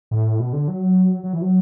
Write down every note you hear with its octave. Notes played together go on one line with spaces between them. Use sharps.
A2
B2
D3
F#3
F#3
E3
F#3